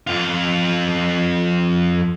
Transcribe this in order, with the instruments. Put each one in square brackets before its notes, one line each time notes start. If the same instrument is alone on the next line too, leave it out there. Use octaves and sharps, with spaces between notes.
[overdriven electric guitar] F2 F4